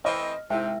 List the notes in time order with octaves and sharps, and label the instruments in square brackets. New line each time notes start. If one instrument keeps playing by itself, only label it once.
[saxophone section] E3 A3 C4 [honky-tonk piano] D#5 [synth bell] F6
[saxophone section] G#2 C3 [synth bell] G#3 E4 [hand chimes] E5 [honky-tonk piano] G5